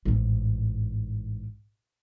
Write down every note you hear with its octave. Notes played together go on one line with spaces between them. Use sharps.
A1 G#2